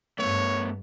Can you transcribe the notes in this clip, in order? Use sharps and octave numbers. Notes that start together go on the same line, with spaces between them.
G2 A3 B3 C#5